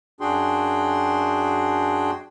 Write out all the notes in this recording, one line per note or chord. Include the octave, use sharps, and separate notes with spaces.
F#2 D4 F#4 G#4 G5 C6